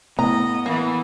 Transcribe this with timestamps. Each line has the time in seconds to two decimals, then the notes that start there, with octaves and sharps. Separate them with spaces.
0.19 A2 B3 D#5 A#5
0.66 E3 A#3